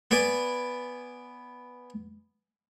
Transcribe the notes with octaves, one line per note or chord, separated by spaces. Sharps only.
B3 B4 D5 G#5